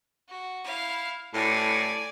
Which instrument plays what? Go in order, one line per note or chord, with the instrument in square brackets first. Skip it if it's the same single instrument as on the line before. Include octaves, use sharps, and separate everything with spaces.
[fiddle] F#4
E4 F5
[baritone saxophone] A2 [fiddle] D5 G#5